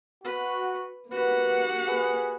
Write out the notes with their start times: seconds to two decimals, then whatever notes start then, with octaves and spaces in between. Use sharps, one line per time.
0.24 F#4 B4
1.11 A#3 F#4 G4 B4 F#5
1.88 G#4 B4